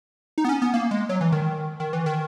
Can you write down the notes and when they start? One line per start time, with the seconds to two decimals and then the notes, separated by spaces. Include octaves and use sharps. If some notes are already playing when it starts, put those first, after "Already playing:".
0.38 D#4
0.45 B3
0.49 C#4
0.62 B3
0.74 A#3
0.91 G#3
1.09 F#3
1.21 E3
1.32 D#3
1.80 D#3
1.93 E3
2.06 D#3